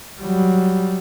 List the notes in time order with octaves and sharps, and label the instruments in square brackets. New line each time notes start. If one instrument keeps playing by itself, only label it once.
[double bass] F#3 G3